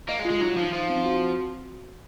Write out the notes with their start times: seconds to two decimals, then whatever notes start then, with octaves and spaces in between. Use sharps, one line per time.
0.09 A#3 D#5
0.19 G#3
0.25 F4
0.30 G#3
0.41 F#3 D#4
0.57 F3 D#4
0.73 F3 F5
0.90 C4
1.05 F#4